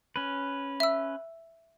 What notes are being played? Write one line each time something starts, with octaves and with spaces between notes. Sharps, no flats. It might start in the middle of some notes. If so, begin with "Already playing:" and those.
C#4 B4
E5 E6